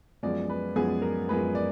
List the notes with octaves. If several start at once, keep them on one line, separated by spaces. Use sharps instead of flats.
F#2 F3 G#3 B3 D5
B4
F#2 F3 G#3 B3 G#4
A#4
F#2 F3 G#3 B3 B4
D5